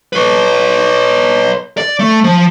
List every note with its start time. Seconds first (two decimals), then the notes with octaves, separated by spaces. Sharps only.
0.13 B4 C#5
1.77 D5
1.99 A3
2.24 F3